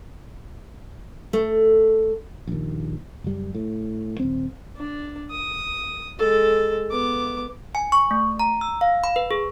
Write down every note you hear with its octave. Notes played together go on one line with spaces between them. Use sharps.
A3
A#1 D#2
F#1 G3
A2
D#1 C4
D4
D#6
G#3 A4
B3 D6
G#5
C#6
A3
A#5
E6
F5
B5
B4
G#4